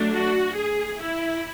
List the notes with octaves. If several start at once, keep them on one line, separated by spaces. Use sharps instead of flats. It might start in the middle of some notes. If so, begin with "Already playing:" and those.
Already playing: F#3 A3 D4
F#4
G#4
E4